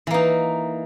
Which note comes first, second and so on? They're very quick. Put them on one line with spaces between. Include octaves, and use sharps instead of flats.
E3 A#3 D#4